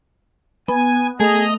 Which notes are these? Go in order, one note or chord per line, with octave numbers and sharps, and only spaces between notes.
B3 G#5
A3 G#4 D#5 F7